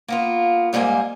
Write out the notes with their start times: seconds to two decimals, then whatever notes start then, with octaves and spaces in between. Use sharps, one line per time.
0.08 A#3 B3 F4
0.73 G#2 G3 A#3 C4 G#5